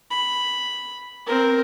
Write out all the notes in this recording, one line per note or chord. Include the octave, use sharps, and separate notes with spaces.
B5
C4 A#4